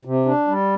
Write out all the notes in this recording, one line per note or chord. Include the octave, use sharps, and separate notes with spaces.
C3
D4
G3